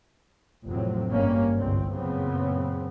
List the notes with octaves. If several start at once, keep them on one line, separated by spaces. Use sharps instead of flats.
F1 E2 A2 F#3 C4
G#1 G2 G3 A#3 C#4
G1 C2 G#2 C4
F#2 A#2 C#3 B3 C4